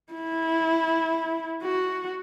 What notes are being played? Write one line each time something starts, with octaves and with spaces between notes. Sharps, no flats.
E4
F#4